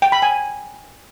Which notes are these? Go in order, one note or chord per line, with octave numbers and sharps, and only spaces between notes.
G5
B5
G#5